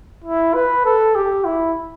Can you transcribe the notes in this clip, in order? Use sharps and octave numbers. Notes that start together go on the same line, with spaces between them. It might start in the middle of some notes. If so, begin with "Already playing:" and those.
E4
B4
A4
G4
E4